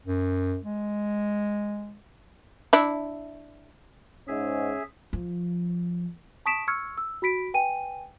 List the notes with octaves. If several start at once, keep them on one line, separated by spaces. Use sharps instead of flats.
F#2
G#3
D4 E4
G#2 C#4 G#4 E5
F3
A5 C#6 D#6 B6 D7 E7
C#6 E6 F6 G#6 C#7
E6
F#4 B5 B6 D7
B4 G5 G#5 D#7